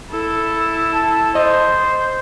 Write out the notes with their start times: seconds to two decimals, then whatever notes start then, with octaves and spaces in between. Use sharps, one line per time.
0.11 E4 A4
0.94 A5
1.35 C5 D#5